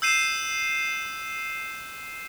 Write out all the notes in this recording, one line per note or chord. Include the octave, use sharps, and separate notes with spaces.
E6 G6 C7 D#7 E7